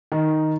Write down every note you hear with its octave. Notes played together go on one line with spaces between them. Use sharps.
D#3